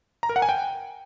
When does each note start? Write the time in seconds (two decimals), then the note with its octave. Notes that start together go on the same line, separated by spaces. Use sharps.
0.23 A#5
0.29 A#4
0.36 F#5
0.42 G#5
0.49 G5